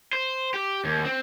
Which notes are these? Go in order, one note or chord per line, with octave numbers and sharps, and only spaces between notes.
C5
G4
D#2
C4